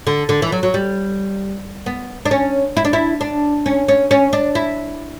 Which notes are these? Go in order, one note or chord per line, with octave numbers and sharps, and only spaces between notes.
D3
D3
E3
F#3
F#3
G3
B3
D4
C#4
E4
D4
E4
D4
C#4
C#4
C#4
D4
E4